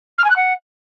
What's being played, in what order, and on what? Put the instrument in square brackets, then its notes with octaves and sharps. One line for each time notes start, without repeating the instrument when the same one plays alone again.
[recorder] F6
G#5
F#6
F#5